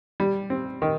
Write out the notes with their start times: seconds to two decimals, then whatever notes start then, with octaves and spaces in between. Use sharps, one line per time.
0.20 G3
0.50 C4
0.82 D#3